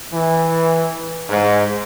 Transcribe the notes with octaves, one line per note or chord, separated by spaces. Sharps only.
E3
G#2